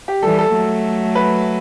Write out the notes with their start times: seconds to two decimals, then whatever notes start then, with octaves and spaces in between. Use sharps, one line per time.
0.08 G4
0.23 E3 G3 A4
0.39 A4
0.54 F#3 A3
1.15 B4